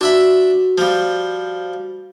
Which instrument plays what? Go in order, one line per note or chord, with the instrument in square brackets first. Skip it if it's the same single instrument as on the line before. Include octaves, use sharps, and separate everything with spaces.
[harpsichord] D4 E5 B5 [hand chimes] F#4
[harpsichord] F3 G3